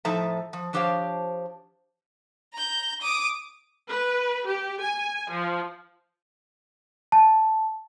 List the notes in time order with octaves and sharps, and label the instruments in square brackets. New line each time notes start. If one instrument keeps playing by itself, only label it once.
[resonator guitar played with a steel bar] A2 F3 D#4 A4 E5 A#5
F3
F3 D4 G4 C5 C#5 F5
[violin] A#5 G6
D6 D#6
[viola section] B4
G4
G#5
F3
[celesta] A5